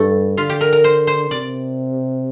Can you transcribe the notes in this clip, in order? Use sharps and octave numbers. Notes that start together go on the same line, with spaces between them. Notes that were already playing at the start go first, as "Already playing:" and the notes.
Already playing: G2 A3
D3 F4
G4
A#4
A#4
C5
C5
C3 D5